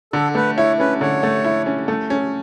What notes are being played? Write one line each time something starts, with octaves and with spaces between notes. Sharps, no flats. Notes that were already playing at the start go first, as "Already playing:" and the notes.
D3 A4
A3 B4
E4 C#5
C#4 B4
D3 C#5
A3
E4
C#4
A3
C#4